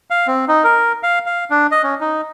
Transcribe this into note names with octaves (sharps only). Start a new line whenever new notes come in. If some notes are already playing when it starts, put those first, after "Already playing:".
F5
C4
D#4
A#4
F5
F5
D4
D#5
C#4
D#4